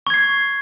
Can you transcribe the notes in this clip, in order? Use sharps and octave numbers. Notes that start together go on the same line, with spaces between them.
C#6 G#6 C7